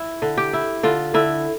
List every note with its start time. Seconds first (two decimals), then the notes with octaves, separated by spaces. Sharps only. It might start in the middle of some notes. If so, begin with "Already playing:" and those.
Already playing: E4
0.22 D3
0.37 G4
0.53 E4
0.83 D3 F4
1.14 D3 E4